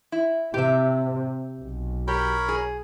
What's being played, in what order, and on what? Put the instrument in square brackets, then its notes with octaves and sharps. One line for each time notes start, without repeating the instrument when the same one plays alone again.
[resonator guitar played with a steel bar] E4
[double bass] C3 [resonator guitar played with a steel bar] G4 E5
[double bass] B1
[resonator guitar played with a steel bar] G4 [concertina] A#4 C#5 B5
[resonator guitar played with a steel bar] G#4